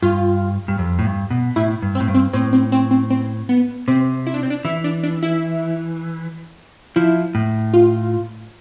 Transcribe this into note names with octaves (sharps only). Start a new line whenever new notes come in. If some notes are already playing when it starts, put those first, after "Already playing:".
G2 F4
G2
F2
A2
G2
B2
A2 E4
G2
C4
A2
G2
C4
A2 C4
C4
C4
C4
C4
B3
C3 C4
E4
D4
C4
D4
E3 E4
D4
D4
E4
F3 E4
A2
F4